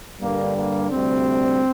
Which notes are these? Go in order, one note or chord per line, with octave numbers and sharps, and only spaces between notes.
G2 D3 G3 A#3
A#3
D2 C3 G3 C4